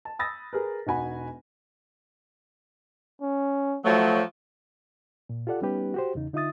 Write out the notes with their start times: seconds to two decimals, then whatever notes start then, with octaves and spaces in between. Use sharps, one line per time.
0.05 A5
0.19 B5 D#6 E6 A6 A#6
0.53 G#4 A#4 B4
0.87 E1 D#4 F#4 G#5 B5
3.22 C#4
3.85 F3 F#3 A3
5.29 A#2
5.47 F4 G4 A4 D5 F#5
5.62 G3 B3 C#4 D#4 G4 B4
5.94 F#4 G4 C5
6.15 E2 C#3 D#4
6.33 D3 D#4 F4 E5 D#6 A6